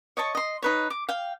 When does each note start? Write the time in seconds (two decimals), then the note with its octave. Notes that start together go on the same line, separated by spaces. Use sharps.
0.17 C#5 D#5 A5 C#6
0.35 D#5 C6
0.62 D#4 B4 C#5
0.90 D6
1.09 F5 G5